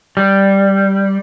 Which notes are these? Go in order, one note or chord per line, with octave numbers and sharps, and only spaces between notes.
G3